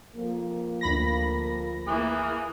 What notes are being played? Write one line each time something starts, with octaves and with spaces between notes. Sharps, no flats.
F2 F3 A#3
D2 B5 A#6
E3 A#3 G#4